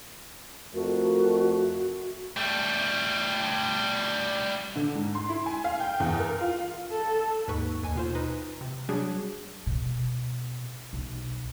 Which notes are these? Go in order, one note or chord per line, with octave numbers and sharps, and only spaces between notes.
F2 A3 F#4 A#4
G3 A3
D3
G#2
C6
E4
G#5
F5
G5
E2
A#4
F4
A4
D#2 G#2 B4 C#6
D#2 G#5
B2 F4 C5
D#4 B4
C3
F#3 G3 D4 F#4 G#4
B2
B1